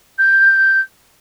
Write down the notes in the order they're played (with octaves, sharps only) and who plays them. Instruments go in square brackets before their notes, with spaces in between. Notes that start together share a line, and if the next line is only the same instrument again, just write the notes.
[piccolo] G6